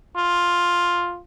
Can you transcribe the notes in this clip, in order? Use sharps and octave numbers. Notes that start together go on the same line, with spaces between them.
F4